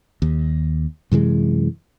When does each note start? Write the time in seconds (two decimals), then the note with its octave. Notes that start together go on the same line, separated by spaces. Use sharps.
0.22 D#2
1.12 F#2 C3 E3 G#3